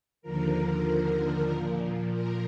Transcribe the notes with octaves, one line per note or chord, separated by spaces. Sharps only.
D#2 D3 F3 A#4
A#2 F3
A#4